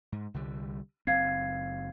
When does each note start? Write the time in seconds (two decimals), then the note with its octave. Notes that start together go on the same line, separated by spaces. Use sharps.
0.12 G#2
0.34 C2 D3 G3
1.07 F#1 F#2 C4 F5 G#6 C7